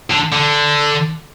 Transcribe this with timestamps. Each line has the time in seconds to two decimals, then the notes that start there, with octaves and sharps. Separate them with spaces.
0.10 D3
0.32 D3